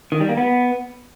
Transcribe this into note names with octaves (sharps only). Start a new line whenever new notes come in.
D#3
G3
A#3
B3